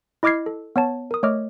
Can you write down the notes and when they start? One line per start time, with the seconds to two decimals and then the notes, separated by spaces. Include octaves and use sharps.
0.23 E4 D#5 D6 F6 G#6 C7
0.46 A4
0.76 B3 C#5 A5
1.11 A#4 D#6
1.23 A3 C#5 D#5 D6 F6